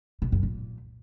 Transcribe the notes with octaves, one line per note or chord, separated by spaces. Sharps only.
B2
F#2
A#2